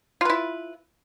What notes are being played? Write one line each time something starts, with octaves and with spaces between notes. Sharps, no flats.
E4 F4 B4